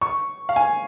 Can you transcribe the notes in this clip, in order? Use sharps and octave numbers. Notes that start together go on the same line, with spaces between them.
C#6
F5
G#5